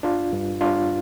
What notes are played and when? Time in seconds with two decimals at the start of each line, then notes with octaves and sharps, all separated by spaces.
0.03 G2 D4 F4
0.33 G2
0.61 G2 D4 F4